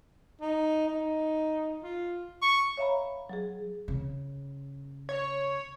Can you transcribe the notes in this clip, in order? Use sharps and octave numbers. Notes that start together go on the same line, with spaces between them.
D#4
D#4
F4
C#6
C#5 E5 F5 A#5 B5
F#3 G#4
C#3
C#5